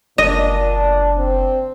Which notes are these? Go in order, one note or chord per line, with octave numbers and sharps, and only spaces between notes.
F#1 A#2 D4 D#5
C4